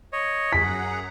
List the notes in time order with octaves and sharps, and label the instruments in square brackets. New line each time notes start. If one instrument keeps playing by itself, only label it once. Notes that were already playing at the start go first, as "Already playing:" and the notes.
[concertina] C#5 D#5
[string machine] F#2 F#5 A#5 [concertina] G#4 [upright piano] B6